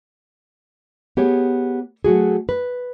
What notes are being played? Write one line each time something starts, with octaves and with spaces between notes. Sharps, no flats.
B3 G4 G#4 C#5
F#3 A3 F#4 G#4
B4